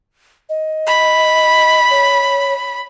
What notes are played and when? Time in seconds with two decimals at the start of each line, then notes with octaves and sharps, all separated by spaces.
0.49 D#5
0.88 B5
1.90 C#5